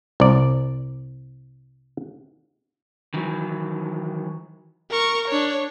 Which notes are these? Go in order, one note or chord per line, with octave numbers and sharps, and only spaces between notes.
C2 D5
D#3 E3 F#3
A#4 C#6
D4 C#5